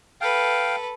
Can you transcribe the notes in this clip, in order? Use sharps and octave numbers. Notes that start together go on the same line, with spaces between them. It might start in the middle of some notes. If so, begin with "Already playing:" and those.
A4 B4 F5 G5